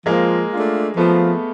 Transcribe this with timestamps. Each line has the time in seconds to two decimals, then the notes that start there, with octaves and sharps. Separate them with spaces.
0.06 F3 G#3 A#3
0.52 A3 D4 F4
0.97 F3 A3 B3